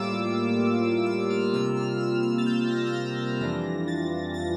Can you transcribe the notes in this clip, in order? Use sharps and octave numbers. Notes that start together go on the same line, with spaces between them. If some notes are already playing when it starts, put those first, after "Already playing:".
Already playing: A2 G3 A#3 F4 D6 E6
E6
F6
C3 G3 A#3 F4 E6
F6
E6
E6
A6
G6
A#6
A#6
A6
F2 E3 G3 D4 F4 A#6
A6
A6